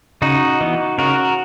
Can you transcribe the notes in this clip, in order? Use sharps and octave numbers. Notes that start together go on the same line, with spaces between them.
C#3 D#4 F#4
E3 B3
C#3 F#4 A#4